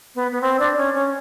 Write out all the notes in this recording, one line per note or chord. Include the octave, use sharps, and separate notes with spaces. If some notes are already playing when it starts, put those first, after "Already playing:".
B3
B3
C4
D4
C#4
C#4